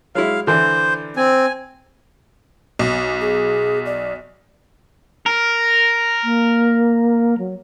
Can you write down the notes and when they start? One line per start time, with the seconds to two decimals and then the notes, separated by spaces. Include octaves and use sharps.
0.15 F#3 G#3 E4 F5
0.47 D3 E3 D4 C5
1.17 C4 G#5
2.79 B1
3.21 G#4
3.86 D5
5.26 A#4
6.24 A#3
7.38 F#3